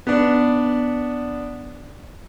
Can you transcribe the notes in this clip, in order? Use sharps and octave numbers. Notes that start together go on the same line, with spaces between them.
B3 D4